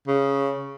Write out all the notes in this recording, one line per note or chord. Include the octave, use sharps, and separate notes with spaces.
C#3